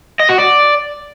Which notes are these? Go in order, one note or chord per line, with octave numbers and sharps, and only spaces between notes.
D#5
F#4
D5